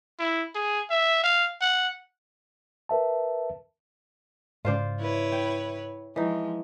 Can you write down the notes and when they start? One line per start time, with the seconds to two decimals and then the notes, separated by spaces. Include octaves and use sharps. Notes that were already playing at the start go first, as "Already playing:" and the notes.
0.19 E4
0.55 G#4
0.90 E5
1.23 F5
1.61 F#5
2.89 A#4 B4 E5 A5
4.65 G#2 C#3 F4 C5 D5
5.00 E4 B4 C#5
5.32 G5
6.16 E3 F3 G#3 D#4